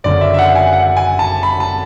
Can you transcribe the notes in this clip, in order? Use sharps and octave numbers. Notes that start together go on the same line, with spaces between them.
F#1 F#2 D3 D5
E5
E5
F#5
G#5
F#5
G#5
A5
B5
A5